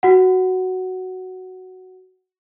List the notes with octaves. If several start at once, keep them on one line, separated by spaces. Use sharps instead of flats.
F#4 F#5